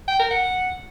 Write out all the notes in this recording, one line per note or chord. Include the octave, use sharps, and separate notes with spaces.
G5
A#4
F#5